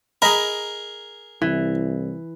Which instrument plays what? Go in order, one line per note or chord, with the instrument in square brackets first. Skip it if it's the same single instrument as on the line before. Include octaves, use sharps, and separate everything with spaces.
[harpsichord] G#4 A#4 [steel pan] D#5 A#5 B5
[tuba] C2 [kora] E3